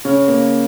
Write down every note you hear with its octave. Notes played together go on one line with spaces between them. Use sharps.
C#3 C#5
A#3